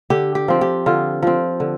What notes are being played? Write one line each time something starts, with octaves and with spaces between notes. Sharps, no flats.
D3 G4
G4
F3 C4
G4
D3 F4
F3 C4
D3